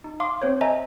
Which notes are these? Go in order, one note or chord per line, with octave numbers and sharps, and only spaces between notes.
D#4
F5 C6 D6
C4 C5 C#5
A4 C5 D#5 E5 G#5 A#5